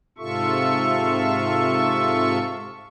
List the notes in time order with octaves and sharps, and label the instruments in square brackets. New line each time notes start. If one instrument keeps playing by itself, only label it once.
[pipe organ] G#2 C3 F4 A4 E5 C#6